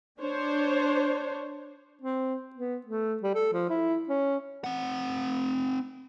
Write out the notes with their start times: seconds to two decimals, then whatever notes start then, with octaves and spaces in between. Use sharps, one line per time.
0.20 D4 C5 C#5
2.01 C4
2.55 B3
2.86 A3
3.22 G3
3.35 A4
3.53 F3
3.69 E4
4.09 C#4
4.64 C4 F#5